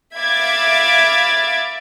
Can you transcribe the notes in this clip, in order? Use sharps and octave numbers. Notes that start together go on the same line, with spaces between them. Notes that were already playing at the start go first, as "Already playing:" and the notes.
E5 F5 B5 D6 G#6 A6